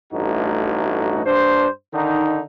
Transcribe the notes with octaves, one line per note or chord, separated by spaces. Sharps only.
A1 G2 A3 D#4 F#4
G2 D4 C5
D3 D#3 D#4